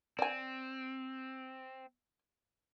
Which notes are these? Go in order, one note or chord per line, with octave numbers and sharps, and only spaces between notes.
C4 D5 G#5